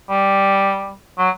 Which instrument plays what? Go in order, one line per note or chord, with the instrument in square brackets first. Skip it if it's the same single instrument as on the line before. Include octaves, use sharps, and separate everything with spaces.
[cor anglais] G3
F#3